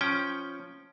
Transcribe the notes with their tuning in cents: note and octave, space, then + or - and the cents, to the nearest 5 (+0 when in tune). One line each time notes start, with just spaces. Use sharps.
F3 +0 C#4 +0 G5 +0